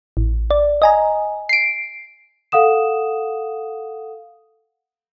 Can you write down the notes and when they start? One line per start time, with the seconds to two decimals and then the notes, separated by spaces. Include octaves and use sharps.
0.17 A1
0.51 D5
0.82 D#5 G#5 A#5
1.49 C7 D7
2.52 A4 F5 F#5 D#6 E7